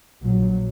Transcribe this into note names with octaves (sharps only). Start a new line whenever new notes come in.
A#1 A#2 F#3